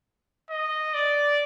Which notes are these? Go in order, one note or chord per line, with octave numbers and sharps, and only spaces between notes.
D#5
D5